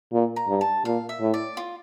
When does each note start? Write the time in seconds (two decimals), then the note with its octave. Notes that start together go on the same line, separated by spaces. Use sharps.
0.13 A#2
0.36 A#5
0.48 G2
0.61 A5
0.85 A#2 F5
1.09 E5
1.21 A2
1.34 D5
1.57 F4